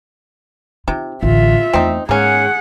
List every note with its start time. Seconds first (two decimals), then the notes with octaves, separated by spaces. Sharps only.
0.88 C3 D#4 F4
1.23 A1 D2 F4 E5
1.73 E2 A3 C4 D#4
2.09 G#2 A#3 C#4 G#4 F#5